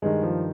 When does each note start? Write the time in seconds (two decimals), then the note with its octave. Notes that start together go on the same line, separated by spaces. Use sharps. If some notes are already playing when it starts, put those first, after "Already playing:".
0.02 G2 D#3 G#3
0.22 F3